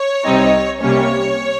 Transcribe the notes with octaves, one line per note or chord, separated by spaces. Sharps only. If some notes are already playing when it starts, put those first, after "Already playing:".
Already playing: C#5
C2 C3 G3 C4 D#4
C3 G3 A#3 C#4 C#5